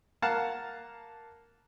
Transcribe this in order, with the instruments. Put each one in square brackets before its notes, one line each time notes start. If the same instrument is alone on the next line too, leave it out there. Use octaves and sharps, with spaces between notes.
[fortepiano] A#3 F5 F#5 A5 A#5